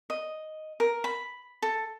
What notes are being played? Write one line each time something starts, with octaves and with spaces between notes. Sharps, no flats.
D#5
A#4
B5
A4